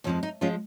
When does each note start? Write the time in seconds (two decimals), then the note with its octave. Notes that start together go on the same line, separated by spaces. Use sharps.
0.04 F2 F3 G#3 C#4
0.23 D#4
0.41 F3 G#3 C#4 F4